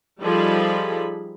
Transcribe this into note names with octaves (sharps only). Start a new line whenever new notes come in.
F3 G3 D#4 G#4 A4 B5